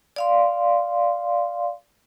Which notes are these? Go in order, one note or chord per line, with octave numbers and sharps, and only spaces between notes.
D5 F5 C6